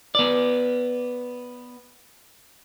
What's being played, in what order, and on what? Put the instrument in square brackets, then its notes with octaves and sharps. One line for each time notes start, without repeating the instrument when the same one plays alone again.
[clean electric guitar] B3 D5